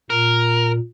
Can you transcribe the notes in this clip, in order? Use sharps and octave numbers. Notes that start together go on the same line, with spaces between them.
A#2 A#4